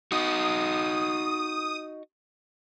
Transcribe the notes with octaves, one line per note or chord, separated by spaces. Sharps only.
D#4 F#4 D#6